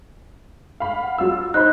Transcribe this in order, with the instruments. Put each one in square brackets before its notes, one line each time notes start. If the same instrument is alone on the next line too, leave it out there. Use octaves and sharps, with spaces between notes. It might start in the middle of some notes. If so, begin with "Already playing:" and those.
[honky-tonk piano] F5 B5
[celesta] F#5
[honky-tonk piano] F#3 F4 E6
[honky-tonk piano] D#4 C5 B5 [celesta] F#6